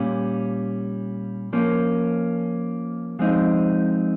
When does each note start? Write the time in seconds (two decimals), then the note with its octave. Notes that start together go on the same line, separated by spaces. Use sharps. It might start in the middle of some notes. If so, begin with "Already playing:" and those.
Already playing: A#2 G3 C#4
1.53 F3 A#3 C#4
3.19 F3 G#3 C4 D#4